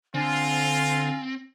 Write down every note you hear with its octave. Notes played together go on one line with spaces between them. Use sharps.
D3 C4 F4 G#5